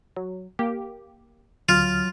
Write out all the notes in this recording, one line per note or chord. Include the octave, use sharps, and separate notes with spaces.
F#3
A#3 G4
D2 F#3 F4 F6